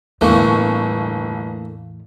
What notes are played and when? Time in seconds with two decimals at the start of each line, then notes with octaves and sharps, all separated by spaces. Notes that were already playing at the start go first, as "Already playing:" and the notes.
0.21 G1 E2 A2 E3 A3 A#3 C#6